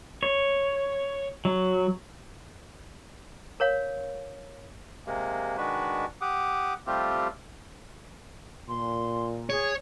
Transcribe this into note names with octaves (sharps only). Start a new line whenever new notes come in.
C#5
F#3
A#4 C#5 F5
C3 G#3 A#3
D#3 G#3 D4 F#4 B4
G4 F#5 D6 D#6
G3 A3 C4 F4 G4
A#2 C6
G#4 C#5